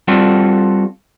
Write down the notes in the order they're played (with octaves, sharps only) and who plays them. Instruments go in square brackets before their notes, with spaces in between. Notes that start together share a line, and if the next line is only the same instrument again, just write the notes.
[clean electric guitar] G3 C4 F4 F#4 A4